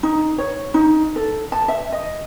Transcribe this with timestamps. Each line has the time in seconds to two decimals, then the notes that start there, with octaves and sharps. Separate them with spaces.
0.03 D#4
0.38 C#5
0.74 D#4
1.16 A4
1.52 A5
1.68 E5
1.92 D#5